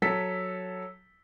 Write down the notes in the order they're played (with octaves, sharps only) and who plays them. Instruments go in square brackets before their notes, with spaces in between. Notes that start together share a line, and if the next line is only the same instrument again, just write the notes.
[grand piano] F#3 A4 B6